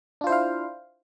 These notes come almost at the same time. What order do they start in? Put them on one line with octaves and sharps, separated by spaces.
D4 F4 C5 E4 F5